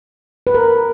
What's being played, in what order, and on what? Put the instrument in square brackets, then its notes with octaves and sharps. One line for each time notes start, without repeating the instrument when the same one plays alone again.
[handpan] B4
A#4